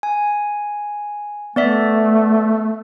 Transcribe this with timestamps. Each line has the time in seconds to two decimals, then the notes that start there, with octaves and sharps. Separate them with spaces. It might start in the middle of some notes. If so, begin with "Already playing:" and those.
0.03 G#5
1.56 A3 B3 D5 E5